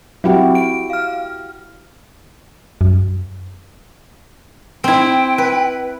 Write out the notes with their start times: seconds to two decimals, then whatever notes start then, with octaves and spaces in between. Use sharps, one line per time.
0.24 F#3 C4 E4 F#4 G4
0.55 D7
0.90 F5 F6
2.81 F#2
4.84 C4 E4 G5
5.38 B4